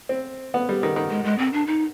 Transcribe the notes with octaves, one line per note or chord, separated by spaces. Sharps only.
C4
B3
G3
D#3
D#3
G#3
G#3
C4
D4
D#4